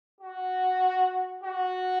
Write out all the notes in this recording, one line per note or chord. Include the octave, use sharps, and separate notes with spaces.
F#4
F#4